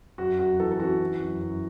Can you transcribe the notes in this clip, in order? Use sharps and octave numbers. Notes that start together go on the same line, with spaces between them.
F#2 F#4
F#2 F#4
E3 A4
A4
E3 F#4
E3
F#2
F#2